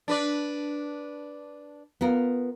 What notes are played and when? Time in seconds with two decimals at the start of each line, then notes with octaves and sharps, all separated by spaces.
0.08 D4 B4 D5
2.01 B3 F4 A#4